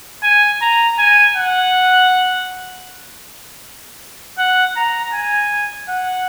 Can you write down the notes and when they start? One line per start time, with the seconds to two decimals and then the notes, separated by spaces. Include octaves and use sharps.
0.23 G#5
0.62 A#5
0.99 G#5
1.37 F#5
4.38 F#5
4.77 A#5
5.14 G#5
5.89 F#5